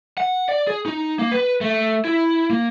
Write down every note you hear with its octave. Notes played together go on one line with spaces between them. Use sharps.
F#5
D5
G#4
D#4
A#3
B4
A3
E4
A#3